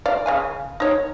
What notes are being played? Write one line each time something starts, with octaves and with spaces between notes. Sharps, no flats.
D5 F5
C#3 F5 G#5
D#4 C#5